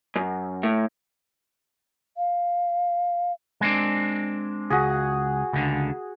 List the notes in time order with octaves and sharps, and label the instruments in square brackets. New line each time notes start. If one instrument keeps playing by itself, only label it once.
[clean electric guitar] F#2
A2
[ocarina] F5
[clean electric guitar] G#3 C4 D4
[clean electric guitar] C#2 [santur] F#4 G#4
[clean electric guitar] C#2 D3